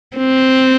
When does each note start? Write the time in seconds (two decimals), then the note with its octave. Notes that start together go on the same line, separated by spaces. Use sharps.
0.17 C4